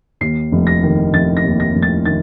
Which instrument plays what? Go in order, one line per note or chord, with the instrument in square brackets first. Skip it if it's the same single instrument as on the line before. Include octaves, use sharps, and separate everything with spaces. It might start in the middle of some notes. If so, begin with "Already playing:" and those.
[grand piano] D#2 C7
F1
A#6
D#3
F1 A6
A#6
D#2
A#6
F1
A6
D#3 A6